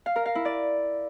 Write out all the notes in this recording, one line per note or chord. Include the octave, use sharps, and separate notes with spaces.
F5
A#4
F5
E4
D5